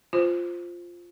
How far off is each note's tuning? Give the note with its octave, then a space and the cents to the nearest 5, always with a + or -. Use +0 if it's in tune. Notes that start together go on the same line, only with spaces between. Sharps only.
F4 +0 C5 +0